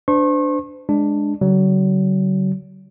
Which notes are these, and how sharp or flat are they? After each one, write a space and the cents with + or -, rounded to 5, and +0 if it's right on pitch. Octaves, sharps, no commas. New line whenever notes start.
D4 +0 C5 -40 C#6 -40
G#3 +0 D4 +5
D3 -45 F#3 +35